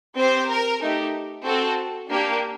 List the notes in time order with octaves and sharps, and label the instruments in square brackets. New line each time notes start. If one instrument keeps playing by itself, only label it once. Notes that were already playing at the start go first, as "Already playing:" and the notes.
[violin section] C4 G4 C5
A#4
A3 D#4 G4
C4 F#4 A4
A#3 D4 G4